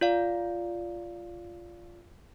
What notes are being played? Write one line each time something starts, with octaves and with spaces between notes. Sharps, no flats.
F4 D5 F5